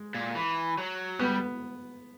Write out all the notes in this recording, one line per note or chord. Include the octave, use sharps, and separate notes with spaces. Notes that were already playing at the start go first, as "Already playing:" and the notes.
Already playing: G#3
A#2
E3
F#3
G3 B3